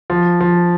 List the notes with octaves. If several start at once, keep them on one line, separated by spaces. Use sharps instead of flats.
F3
F3